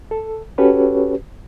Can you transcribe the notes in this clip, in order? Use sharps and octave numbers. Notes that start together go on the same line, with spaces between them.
A4
C#4 F#4 G4 A4 B4 C#5